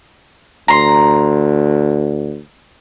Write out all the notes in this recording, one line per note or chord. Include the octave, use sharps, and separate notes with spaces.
D2 A#5 C6